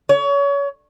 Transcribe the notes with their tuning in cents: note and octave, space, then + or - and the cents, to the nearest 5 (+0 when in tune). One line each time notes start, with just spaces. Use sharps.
C#5 +30